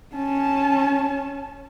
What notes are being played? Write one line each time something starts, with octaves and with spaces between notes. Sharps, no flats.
C#4 A5